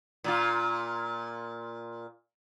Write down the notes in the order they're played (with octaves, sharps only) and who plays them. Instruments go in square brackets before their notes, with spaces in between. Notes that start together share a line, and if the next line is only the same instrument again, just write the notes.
[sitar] A#2 A#3 F4